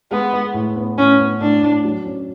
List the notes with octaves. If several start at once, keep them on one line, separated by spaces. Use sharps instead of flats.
G#3 B3
G#3
A2
B3
A2 C#4
B3
A2 D4
A2
F#3
C#4